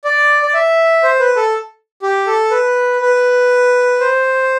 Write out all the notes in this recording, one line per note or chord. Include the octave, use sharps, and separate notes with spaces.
D5
D5
E5
C5
B4
A4
G4
A4
B4
B4
C5